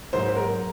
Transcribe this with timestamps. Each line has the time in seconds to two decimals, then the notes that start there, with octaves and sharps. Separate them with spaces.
0.13 G#2 F#3 A#3 C5
0.37 A#4